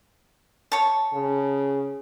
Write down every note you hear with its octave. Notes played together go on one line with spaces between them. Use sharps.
C#5 A5
C#3